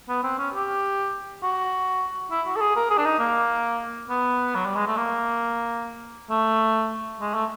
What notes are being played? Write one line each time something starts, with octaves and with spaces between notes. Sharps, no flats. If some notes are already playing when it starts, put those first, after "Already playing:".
B3
C4
C#4
G4
F#4
E4
F#4
A4
G#4
A#4
G#4
D4
D#4
A#3
B3
F#3
G3
G#3
A3
A#3
A3
G#3
A3